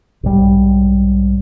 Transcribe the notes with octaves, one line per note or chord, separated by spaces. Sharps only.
B1 G#2 G3